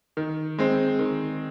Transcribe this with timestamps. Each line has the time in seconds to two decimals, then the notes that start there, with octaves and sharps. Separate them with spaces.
0.17 D#3
0.58 G#3 C4
0.99 D#3